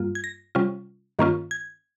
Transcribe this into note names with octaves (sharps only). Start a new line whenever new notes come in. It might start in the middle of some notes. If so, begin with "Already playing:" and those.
Already playing: G2 G3 A#3 F4
G#6
A#6
C3 G3 C#4 F4
G2 D#3 A#3 C#4 F4
G#6